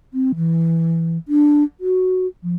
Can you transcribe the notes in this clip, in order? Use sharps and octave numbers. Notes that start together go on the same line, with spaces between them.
C4
E3
D4
F#4
F3